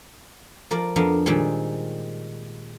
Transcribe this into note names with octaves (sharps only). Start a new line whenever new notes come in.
F3 A#4 D5
F2 B3 D4 A#4 F5 A#5
A#2 D#3 G3 G#3 C4